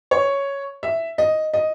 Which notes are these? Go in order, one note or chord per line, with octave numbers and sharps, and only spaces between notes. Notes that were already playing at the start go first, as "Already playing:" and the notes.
C#5
E5
D#5
D#5